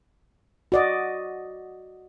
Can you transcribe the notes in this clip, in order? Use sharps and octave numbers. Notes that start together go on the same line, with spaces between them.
F#4 D5 D#5